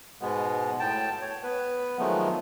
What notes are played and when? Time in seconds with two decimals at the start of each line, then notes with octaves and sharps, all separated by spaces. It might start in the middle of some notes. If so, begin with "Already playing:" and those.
0.21 G#2 B2 G#3 B3
0.80 A2 G5 A5
1.21 C#5
1.43 B3 B4
1.99 D#3 F3 F#3 G#3 A3 B3